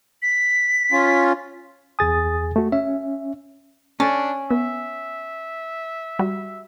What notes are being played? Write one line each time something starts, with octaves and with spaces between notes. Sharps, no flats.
B6
C#4 F4
E2 G#4 G#5 D#6 A6
A3 F#4
C#4 E5
C#4 D4 A4 A6
B3 E5
G3 F#4